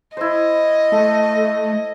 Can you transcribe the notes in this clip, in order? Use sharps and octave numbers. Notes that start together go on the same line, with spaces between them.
E4 C5 D#5
A3 A4